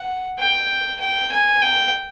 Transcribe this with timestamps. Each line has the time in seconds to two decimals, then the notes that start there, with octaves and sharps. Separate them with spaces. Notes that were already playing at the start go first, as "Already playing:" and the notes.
Already playing: F#5
0.39 G5
1.00 G5
1.32 G#5
1.62 G5